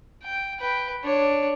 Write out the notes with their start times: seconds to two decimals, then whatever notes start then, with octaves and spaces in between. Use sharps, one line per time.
0.23 G5
0.60 B4 G5
1.04 D4 C#5